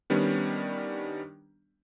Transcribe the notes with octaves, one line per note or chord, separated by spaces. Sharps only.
D#3 G3 B3 C#4 D4